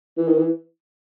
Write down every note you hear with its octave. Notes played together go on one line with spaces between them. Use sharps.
E3
D#3
E3